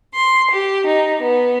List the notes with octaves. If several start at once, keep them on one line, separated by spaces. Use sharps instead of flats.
C6
G4
D#4
B3